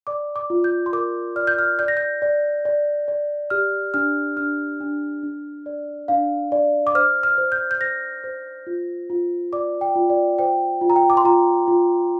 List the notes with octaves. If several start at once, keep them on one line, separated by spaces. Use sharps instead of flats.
D5 D6
D6
F4
G6
C6
A#4 D6
D5 F6
G6
F6
D5 G6
A#6
G6
D5
D5
D5
G4 F6
D4 F6
D4 F6
D4
D4
D5
D4 F5
D5
D6
C5 F6
F6
C5
G6
G6
C5 A#6
C5
F4
F4
D5 D6
G5
F4
D5
C5 G5
F4
A#5
G5
D6
C6
F4 A#5
F4